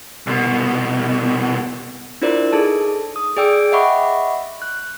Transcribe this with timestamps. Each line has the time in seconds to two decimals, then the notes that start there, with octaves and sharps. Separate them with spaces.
0.27 C2 B2
2.22 D4 E4 F4 A#4 C5 D5
2.52 D#4 G#4 A4 A5
3.16 D#6
3.37 G#4 D5 G5 E6 D7
3.72 D#5 E5 F#5 B5 C#6 D6
4.62 F#6